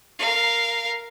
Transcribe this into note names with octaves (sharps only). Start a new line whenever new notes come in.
A#4 F5